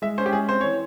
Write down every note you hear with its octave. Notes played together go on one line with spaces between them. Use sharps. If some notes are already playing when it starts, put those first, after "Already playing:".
G#3 E5
C#4 C5
G4
G#3 G#4
C4 C5
E3 C#5